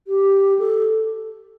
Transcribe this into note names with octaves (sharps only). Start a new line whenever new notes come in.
G4
A4